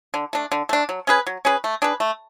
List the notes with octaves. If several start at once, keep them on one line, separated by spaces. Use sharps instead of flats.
D3
A3 D4
D3
A3 D4
F#3
C#4 G#4 B4
F#3
C#4 G#4 B4
A3
D4 G#4 B4
A3